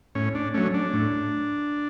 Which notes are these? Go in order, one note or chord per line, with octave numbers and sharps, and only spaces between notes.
A2 C#4
D4
F#3 A3 C#4
D4
A2